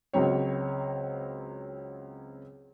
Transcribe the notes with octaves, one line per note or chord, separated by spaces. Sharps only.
C#2 F#3 C4 C#5